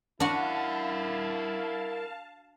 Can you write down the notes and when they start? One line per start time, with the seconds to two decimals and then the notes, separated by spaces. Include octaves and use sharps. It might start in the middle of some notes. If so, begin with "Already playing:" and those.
0.20 D4 E4 F#4 A#4 F5 F#5 A5